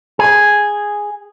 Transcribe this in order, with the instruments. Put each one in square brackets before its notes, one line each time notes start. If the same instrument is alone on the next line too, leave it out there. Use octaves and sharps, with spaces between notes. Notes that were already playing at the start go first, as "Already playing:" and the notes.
[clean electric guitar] G#4